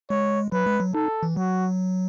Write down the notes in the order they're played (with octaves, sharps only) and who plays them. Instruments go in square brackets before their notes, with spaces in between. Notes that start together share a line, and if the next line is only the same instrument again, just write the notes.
[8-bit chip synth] G#3 [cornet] C#5
[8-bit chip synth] F#3 [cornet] B4
[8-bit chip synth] G#3
F#3
[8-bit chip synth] D#4 [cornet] A4
[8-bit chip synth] E3
[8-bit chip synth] F#3 [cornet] F#4